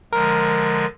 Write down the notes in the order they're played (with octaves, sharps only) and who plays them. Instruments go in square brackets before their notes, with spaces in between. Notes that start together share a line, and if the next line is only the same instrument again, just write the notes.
[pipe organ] D3 F3 G#3 [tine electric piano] A#4